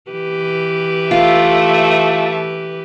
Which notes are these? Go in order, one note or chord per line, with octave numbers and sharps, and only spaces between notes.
E3 G4 B4
A3 F4 E5